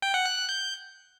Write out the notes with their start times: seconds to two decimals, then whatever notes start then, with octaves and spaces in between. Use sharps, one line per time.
0.02 G5
0.14 F#5
0.26 F#6
0.37 F#6
0.49 G6